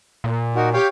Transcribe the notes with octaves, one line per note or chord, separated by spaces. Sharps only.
A#2
D#4 F#4 A#4 F#5
G4 C#5 F5 G5